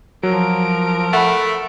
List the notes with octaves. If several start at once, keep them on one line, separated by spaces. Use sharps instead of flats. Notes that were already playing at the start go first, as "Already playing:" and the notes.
F3 F#3 A#4 D7
A3 F#5 B5